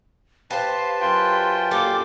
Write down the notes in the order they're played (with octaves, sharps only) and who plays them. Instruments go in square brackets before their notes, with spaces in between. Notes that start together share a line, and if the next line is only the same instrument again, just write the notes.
[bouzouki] G4 C5 [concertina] B4 A5 [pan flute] F5
[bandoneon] F#2 F4 G5 [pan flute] C6
[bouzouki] G3 A#3 A4 [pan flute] D6